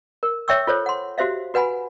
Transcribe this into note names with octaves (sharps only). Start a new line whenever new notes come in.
A#4
C#5 E5 G5 C#6 E6
F4 A4 C5 C#5
F#5 C6
F#4 G4 C5 E5 F5
F#4 B4 F#5 G#5 B5